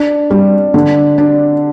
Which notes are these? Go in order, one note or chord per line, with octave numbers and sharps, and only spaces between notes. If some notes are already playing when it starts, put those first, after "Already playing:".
Already playing: D4
G3
D3
D4